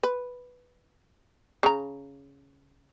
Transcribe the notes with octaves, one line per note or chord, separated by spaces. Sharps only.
B4
C#3 A#5